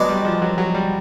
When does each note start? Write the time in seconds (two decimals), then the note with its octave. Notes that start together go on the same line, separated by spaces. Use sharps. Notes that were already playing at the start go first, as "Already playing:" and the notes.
Already playing: B2 F#3 G#3 B3 D4
0.09 G3
0.25 F3
0.42 F#3
0.58 F#3
0.74 G3